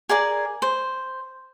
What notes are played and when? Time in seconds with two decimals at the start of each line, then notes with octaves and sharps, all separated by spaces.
0.09 G#4 A#4 D5 G#5
0.62 C5